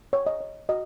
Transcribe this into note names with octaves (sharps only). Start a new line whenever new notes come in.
C#5
D#5
C#5
F#4 D#5